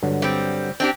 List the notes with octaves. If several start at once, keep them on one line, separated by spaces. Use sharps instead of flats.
G2 D3 F#3
G3 C4
C4 D4 G4